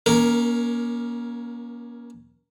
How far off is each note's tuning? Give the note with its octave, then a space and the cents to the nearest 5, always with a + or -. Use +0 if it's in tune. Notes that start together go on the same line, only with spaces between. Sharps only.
A#3 +35 C#4 +20 A#4 +0